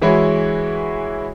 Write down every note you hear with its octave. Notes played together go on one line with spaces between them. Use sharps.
E3 G#3 E4 F#4 C#5